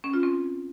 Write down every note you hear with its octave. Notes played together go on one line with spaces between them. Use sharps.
C#4
F4
C4